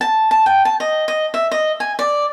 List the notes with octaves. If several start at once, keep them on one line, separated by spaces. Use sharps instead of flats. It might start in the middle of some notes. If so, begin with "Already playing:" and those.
A5
A5
G5
A5
D#5
D#5
E5
D#5
G#5
D5